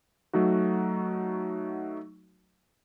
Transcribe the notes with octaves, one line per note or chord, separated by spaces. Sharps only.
F#3 A3 D#4 F#4